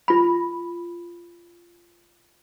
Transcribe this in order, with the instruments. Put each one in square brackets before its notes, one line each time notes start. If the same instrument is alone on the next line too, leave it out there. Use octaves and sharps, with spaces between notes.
[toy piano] F4 B5